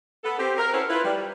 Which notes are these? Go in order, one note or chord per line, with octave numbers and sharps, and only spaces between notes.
B3 A4
C4 G4
A#4
C#4 E4 F#4 A4 B4 C5
E4 F4 B4
G3